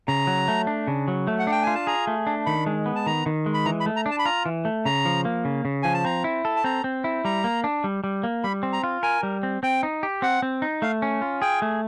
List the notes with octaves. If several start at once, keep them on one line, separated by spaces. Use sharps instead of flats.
C#3 A#5
F#3
A3
D4
C#3
F#3
A3
F#5
D4 G5
F4 G#5
A5
G#4 A#5
A3
D4
D#3 B5
G#3
B3
A5
D#3 A#5
D#3
G#3
B5
E3 A#5
B5
A3
A#5
D4
A5
B5
F4 A#5
E3
A3
C#3 A#5
F3
A#3
C#3
C#3
F3 G#5
A5
C4 A#5
E4
A4
A5
C4 A#5
C4
E4
G3 A#5
A#3
D4
G3
G3
A#3
G3 B5
C4
A#5
F4
A#4 G#5
G3
C4
C4 G5
D#4
G4
C4 F#5
C4
D#4
A3 F5
C#4
F4
G#4 G5
A3